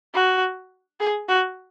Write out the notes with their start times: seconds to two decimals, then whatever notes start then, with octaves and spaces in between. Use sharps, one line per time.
0.14 F#4
1.00 G#4
1.28 F#4